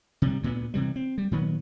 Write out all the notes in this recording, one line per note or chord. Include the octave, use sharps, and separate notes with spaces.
C3 G3
D2 A#2 G3 B3
C3 E3 G3
C4
G3
A#2 D#3 F#3 B3